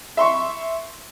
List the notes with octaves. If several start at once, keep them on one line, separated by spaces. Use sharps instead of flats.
E5 C6 C#6